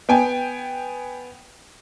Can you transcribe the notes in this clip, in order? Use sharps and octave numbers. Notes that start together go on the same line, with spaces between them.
B3 G5 G#5